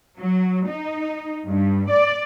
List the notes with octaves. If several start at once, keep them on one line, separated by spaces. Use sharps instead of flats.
F#3
D#4
G2
D5